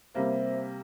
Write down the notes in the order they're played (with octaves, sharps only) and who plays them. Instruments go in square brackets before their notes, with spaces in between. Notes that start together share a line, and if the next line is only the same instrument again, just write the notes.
[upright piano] C3 G3 A#3 [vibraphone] C5 E5